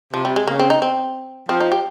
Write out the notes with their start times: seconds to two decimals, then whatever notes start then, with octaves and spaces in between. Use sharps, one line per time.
0.13 C3 F3
0.25 G3
0.36 G#3
0.47 C#3 A#3
0.59 C4
0.70 D#4
0.82 C4
1.49 F3 C4
1.60 D#4
1.72 G4